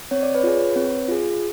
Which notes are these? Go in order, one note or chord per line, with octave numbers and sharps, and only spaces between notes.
C4 C#5
D5
B4 C#5
F4 G#4
C4
F4 G#4